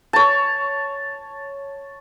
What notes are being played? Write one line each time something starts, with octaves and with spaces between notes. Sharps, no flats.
C#5 A5